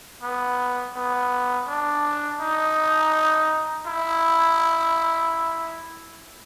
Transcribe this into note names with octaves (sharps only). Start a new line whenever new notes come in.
B3
B3
D4
D#4
E4